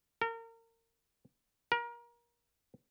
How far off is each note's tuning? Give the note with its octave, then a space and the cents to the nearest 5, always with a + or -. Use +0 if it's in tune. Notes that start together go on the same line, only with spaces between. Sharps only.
A#4 -35
A#4 +25